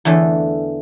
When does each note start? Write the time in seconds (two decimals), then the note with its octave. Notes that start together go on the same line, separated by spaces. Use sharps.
0.05 E2 D3 E3 A3